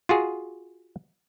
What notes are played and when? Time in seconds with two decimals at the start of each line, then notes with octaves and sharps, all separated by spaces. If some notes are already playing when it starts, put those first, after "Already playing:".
0.09 F4 F#4 G#4